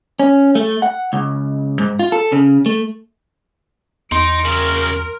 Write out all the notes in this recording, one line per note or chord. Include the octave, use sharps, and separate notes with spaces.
C#4
A3
F#5
C#2
G#2
F4
A4
C#3
A3
E2 D#4 C6 D7
C#3 F#3 A#4